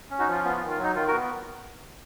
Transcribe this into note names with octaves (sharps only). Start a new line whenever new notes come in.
C#4
D#4 F#4
F3 F4
B3 F4
F4
D#3
F4
F#3 D#4
D#3 F4
F#4 A#4
B3